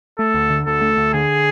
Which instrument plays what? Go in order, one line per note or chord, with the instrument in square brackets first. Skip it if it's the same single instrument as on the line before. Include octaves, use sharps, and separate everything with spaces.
[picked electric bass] A3 [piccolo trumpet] A4
[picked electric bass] D2
D3
[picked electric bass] D2 [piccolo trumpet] A4
[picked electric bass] A3
D2
[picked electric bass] D3 [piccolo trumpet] G#4